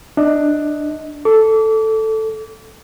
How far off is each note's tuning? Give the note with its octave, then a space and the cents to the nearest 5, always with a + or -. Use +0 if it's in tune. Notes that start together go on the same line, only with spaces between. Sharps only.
D4 +15 D#5 +20
A4 +0 D6 -30